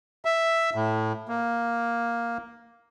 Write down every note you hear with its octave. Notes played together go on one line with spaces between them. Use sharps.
E5
A2
A#3